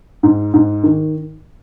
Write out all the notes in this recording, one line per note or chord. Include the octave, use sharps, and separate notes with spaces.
G#2
G#2
D#3